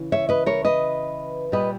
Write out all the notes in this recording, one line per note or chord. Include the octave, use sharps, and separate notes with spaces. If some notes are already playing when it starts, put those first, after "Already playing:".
Already playing: C#3 E3
C#5 E5
B4 D#5
A#4 C#5
B4 D#5
A#2 G3 B4 D#5